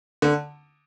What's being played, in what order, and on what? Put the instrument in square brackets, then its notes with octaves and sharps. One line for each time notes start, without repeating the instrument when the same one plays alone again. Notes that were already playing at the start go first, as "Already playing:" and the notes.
[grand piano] D3